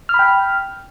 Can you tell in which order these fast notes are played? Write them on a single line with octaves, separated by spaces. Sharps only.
F6 B5 G5